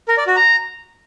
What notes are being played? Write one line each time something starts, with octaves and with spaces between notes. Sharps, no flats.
A#4
D5
F#4
A#5